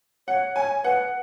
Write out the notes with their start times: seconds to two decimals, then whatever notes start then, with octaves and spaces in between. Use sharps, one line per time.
0.28 C#5 F#5
0.56 C#5 G#5
0.84 B4 F#5